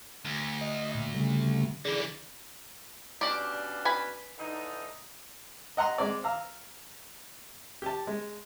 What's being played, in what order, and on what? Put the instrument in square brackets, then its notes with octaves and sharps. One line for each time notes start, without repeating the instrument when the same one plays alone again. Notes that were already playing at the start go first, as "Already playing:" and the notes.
[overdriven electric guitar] D2
[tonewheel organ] D#5
A#2
C#3 G3 A3
[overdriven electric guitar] D3 E3 [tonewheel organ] G#4 D5
[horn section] B2 C#4 D4 [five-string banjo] G4 D5
[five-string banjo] B4 G#5 B5
[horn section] D3 E3 D#4
[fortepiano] D#5 F#5 A#5 C6
G#3 C4 D5
F5 A#5 E6
G4 A5
G#3